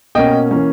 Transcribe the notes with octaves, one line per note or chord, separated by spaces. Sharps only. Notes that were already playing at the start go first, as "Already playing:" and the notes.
B2 A#3 C#4 D#5 G5
E3 A#3 C#4